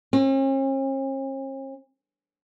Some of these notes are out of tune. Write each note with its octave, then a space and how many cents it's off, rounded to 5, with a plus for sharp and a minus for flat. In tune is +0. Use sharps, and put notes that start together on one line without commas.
C#4 -45